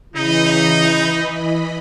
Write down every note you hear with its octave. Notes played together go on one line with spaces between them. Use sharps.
C#3 E3 D#4 E4 D#5 B5